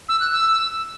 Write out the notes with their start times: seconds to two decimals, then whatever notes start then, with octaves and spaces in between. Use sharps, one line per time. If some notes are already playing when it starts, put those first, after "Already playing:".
0.09 E6
0.20 F#6
0.32 E6